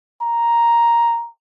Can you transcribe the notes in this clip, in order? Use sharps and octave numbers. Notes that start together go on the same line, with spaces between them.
A#5